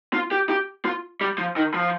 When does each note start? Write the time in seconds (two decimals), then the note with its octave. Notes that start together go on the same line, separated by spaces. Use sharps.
0.13 F4
0.31 G4
0.49 G4
0.85 F4
1.21 G3
1.38 F3
1.56 D#3
1.74 F3